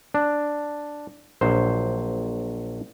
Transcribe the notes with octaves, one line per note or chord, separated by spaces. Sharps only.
D4
A#1 F#3 C5